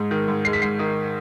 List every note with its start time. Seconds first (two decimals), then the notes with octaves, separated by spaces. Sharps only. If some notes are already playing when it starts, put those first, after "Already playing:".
Already playing: G#2 G#3
0.11 D#3
0.28 G#2
0.45 G#3 C7
0.53 B6
0.62 G#2 C7
0.79 D#3